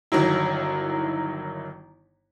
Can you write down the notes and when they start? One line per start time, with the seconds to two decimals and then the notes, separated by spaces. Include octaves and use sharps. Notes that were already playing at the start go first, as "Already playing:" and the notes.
0.12 G1 D#3 F#3 E4